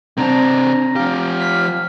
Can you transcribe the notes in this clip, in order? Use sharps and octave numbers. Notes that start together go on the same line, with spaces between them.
C3 C4 D4 C5 A5 A#5
F3 G4 F5
B6